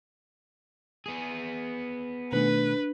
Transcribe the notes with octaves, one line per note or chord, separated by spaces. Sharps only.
B3 G#4
B2 D#3 A3 D4 B4